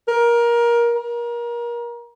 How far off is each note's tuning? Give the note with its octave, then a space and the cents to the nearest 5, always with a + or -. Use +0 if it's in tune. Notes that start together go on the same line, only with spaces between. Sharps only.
A#4 +20
A#4 +30